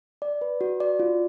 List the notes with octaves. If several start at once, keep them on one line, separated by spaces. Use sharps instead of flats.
D5
B4
F#4
D5
F4